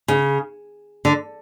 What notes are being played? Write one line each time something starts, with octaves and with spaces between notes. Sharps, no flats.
C#3
D3